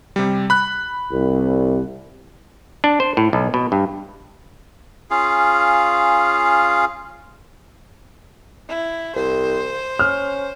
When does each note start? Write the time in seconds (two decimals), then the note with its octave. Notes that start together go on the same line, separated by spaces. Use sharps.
0.16 C3 G3
0.50 B5 F#6
1.11 C2
2.84 D4
3.00 C5
3.17 A2
3.33 B1
3.54 B2
3.72 G2
5.11 C#4 F4 G#4 F5
8.68 E4
9.16 C2 C5
9.99 C#4 F6